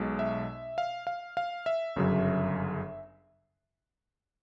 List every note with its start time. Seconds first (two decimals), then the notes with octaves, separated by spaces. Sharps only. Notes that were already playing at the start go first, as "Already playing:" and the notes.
Already playing: B1 B2 G#3
0.19 E5
0.78 F5
1.07 F5
1.37 F5
1.66 E5
1.96 G1 F#2 C#3 F#3